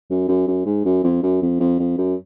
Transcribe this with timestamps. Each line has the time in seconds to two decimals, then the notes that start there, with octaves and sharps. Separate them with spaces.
0.10 F#2
0.28 F#2
0.48 F#2
0.66 G#2
0.85 F#2
1.04 F2
1.23 F#2
1.42 F2
1.60 F2
1.79 F2
1.98 F#2